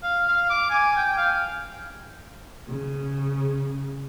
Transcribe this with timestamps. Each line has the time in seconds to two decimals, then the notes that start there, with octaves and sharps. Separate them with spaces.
0.03 F5
0.28 F5
0.50 D6
0.70 G#5
0.97 G5
1.18 F5
2.69 C#3